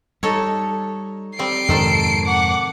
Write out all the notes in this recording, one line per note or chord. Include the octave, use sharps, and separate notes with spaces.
G3 D#4 A4 C#5
G3 C4 C7 D7
F2 G#2 C3 D#3 A4 C5
F#5 D6